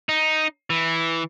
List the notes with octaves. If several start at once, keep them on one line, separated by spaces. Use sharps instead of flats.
D#4
E3